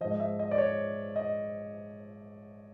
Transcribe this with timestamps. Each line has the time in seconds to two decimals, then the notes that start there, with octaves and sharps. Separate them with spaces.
0.01 F3 D#5
0.05 G#2
0.11 D#5
0.20 E5
0.39 D#5
0.51 D5
0.58 C#5
1.16 D#5